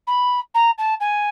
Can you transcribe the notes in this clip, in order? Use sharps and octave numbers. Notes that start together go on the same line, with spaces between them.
B5
A#5
A5
G#5